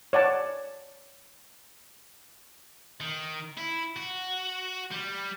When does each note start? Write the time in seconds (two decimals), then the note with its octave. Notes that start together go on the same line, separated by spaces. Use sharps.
0.13 C#5 D5 F#5 A5
3.00 D#3
3.57 E4
3.96 F#4
4.91 G3